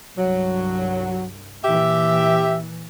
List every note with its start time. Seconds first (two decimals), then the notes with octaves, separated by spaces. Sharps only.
0.18 C2 G2 F#3
1.64 A#2 E3 G4 E5